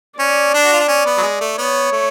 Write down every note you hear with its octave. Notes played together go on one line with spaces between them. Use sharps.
C#4 D5
D4
F#4
F4
D4
C#4
B3
F#3
G#3
A3
B3 C#5
A3